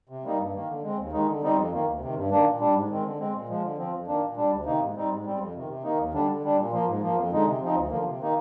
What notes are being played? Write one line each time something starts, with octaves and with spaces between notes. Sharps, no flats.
C3
G3 A#3 D#4
G2
D#3 A#3
D3
G#3 C4
D#2
D#3 G#3 D#4
D3
G3 C4 D#4
F2
D#3 A#3
D2
C3 D#3
G2
D#3 A#3 D4
A#2
G3 D4
G#2
D#3 G#3 C4
D3
G#3 C4
A#2
F3 G#3
D3
F3 C4
F2
D#3 A#3 D4
A#2
G3 D4
D2
C3 D#3 A#3 D#4
G#2
G3 C4 D#4
G#2
G3 C4
F2
C3 D#3
C3
D#3 A#3 D#4
D#2
D3 G3 D4
D3
G3 D4
A#2
F3 A#3
G#2
F3 A#3
F2
D3 G#3 D#4
C3
F3 C4 D#4
D2
D3 F3 A#3
C3
D#3 A#3 D#4